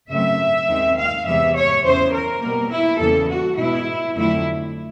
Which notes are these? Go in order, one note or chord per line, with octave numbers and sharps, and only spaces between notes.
F#2 C#3 F#3 A3 C4 E5
D#2 D#3 G#3 C4
F5
E2 C3 E3 G#3 E5
C#5
E2 C#3 E3 C5
A#4
B2 G3 A#3
E4
E2 C#3 E3 G3 A#3 A4
F#4
B2 G#3 B3 E4
F2 D3 F#3 A3 C4 E4